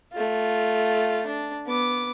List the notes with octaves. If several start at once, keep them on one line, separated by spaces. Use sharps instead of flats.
A3 F4
D4
B3 D6